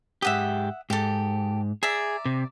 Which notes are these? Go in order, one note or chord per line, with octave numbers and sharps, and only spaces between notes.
G#2 G4 E5 F#5 D#6
G#2 G4 A4
G#4 D5 E5 A#5
C3